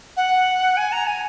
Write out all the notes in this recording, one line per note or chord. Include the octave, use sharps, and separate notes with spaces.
F#5
G#5
A#5
G#5